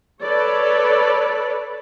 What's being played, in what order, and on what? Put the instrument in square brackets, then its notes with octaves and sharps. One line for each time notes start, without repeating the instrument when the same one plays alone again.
[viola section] A4 B4 C#5 D5